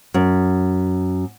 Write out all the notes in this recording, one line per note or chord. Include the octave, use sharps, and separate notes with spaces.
F#2